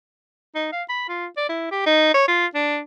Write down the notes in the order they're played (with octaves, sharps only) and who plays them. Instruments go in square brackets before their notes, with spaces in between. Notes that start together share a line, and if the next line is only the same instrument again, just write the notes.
[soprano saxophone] D#4
F5
B5
F4
D5
E4
G4
D#4
C#5
F4
D4